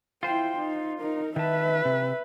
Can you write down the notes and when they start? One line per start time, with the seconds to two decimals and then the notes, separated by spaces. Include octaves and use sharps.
0.23 E4 F4 C5 G5
0.58 D#4
0.99 D#4 A#4
1.36 D#3 B4 E5 A5
1.85 C3